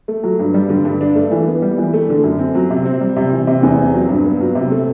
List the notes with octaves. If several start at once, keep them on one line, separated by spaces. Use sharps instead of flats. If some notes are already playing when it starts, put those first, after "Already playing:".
A3
F#3
G2
G3
D3
G2
D4
A3
E3
B3
G3
E3
A3
D3
F#2
C4
F#3
C3
C4
G3
C3
E3
C3
E2
C4
F#3
G2
B3
F#3
C3
A3